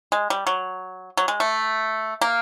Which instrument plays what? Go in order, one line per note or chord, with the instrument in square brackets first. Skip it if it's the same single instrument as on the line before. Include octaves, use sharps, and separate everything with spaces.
[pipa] G#3
G3
F#3
F#3
G#3
A3
A#3